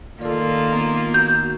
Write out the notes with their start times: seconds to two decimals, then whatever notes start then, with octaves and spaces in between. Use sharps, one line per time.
0.21 D#3 A#3 F4 A4 D5
0.73 B3 F5 A#5
1.14 F#4 A#5 G6